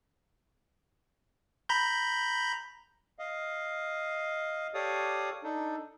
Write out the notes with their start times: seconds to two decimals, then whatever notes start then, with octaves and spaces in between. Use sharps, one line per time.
1.69 A#5 B5 G6
3.19 D#5 F5
4.74 G4 A4 C#5 D5 F5 D#6
5.44 D4 D#4 A4